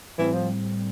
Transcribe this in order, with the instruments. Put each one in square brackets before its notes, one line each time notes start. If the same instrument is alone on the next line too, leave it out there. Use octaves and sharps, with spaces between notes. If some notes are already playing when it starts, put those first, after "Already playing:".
[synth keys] A2 G3 C4 [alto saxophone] E3
[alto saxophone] F3